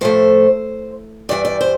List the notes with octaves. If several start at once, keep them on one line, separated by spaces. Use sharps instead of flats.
A2 F3 A3 C5
G2 E3 G3 D5
D5
C5